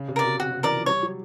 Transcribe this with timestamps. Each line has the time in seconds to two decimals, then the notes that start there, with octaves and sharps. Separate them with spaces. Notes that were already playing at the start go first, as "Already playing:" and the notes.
Already playing: C#3
0.08 C3
0.16 A#4 D5
0.24 B2
0.39 C3 F#4
0.52 C3
0.63 E3 A#4 D5
0.75 F3
0.86 G3 C#5
1.03 F#3